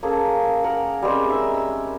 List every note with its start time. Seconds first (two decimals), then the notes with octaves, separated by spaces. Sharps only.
0.03 A#3 C#4 G#4 A4
0.64 A#4 F#5
1.02 G3 G#3 C4 C#4
1.28 D#4 E5 E6
1.54 E6